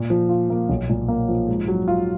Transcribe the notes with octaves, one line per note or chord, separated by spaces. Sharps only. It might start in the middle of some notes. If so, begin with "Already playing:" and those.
Already playing: A#2
F3
F4
A#3
B1
A#2
A#3
F3
G#2
F#3
F4